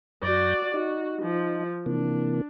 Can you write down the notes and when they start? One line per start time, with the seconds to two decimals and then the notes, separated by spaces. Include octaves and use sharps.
0.23 F#2 F#4 D5 G6 A#6
0.74 D#4 F#4
1.22 F3
1.86 C3 E3 A#3 D4